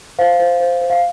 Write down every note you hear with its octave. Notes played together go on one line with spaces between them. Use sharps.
C5 F5
C5
C5
C5
F5